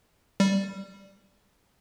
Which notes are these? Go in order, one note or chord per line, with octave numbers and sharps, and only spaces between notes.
G3